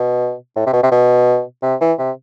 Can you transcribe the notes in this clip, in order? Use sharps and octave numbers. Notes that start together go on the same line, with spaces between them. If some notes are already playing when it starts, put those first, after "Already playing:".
Already playing: B2
A2
C3
B2
C3
B2
C3
E3
C3